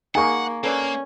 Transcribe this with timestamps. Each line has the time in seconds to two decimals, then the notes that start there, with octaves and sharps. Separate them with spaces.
0.15 A#3 D#4 G#4 A#4 F#5 G#5 C#6
0.64 A#3 C#4 A4 B4 D5